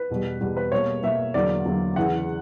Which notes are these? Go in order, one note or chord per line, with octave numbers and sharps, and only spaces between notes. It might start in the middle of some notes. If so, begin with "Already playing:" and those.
Already playing: B4
E2 B2 G3
E2 B2 G3
B4
B2 G3 A#3 C#5
B2 G3 A#3 E5
E2 D3 F#3 A#3 D5
E2 D3 F#3 A#3
E2 C#3 E3 F#5